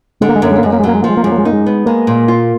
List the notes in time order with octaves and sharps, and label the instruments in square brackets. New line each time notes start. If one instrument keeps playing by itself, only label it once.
[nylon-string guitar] D3 [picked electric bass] G#3
[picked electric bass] A#3
G#3
[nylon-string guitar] F#2 [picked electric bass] A#3
[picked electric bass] G#3
A#3
[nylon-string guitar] F#2 [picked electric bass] G#3
[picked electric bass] A#3
G#3
[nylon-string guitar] F#3 [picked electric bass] A#3
[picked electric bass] G#3
[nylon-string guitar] F3 [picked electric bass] A#3
[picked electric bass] G#3
A#3
[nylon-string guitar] F#2 [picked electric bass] G#3
[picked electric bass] A#3
G#3
[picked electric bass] A#3 [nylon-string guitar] D#4
[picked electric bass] G#3
[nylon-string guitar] B3
[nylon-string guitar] G#3 [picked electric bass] A#3
[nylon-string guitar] A#2
F4